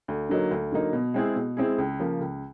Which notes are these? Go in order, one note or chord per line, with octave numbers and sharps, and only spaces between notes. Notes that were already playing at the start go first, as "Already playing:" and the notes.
D2
D3 F#3 A#3 D#4
D2
D3 F#3 A#3 D#4
B2
G#3 C4 E4 G#4
B2
G#3 C4 E4 G#4
C#2
C#3 F3 A#3
C#2